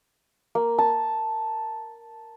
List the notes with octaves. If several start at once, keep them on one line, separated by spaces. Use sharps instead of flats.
A#3
A5